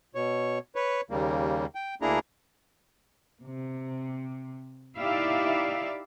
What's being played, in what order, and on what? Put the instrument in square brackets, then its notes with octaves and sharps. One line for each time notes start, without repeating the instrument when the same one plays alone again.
[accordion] B2 C#5
B4 C#5
D#2 C#3 G3 A#3
G5
D2 A#3 D4 E4 G#4 A#5
[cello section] C3
D#4 E4 G4 D5 E5 F5